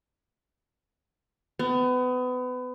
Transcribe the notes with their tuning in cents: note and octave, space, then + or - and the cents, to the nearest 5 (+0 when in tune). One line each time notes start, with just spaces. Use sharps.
B3 +30